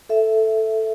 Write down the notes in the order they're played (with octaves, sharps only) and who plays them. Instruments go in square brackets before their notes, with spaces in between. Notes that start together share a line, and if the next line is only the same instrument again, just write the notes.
[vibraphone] A4 E5